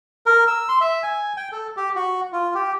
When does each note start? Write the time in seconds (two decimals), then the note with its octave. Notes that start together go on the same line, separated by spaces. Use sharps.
0.26 A#4
0.47 E6
0.68 C6
0.81 E5
1.03 G#5
1.37 G5
1.52 A4
1.77 G4
1.96 F#4
2.32 F4
2.55 G4